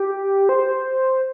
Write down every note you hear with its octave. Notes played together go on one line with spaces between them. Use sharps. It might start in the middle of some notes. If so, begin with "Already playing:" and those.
Already playing: G4
C5